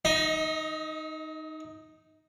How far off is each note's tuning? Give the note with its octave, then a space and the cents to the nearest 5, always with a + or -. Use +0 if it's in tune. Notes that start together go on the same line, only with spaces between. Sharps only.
D#4 +0 D#5 +35